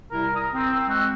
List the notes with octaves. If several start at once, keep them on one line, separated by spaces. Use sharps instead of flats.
C3 G3 E4 A#4
A#5 D#6
C4
G5 E6
G#3 C4 F#4